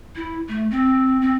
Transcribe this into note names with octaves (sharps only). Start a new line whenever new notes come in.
E4
A3
C4
C4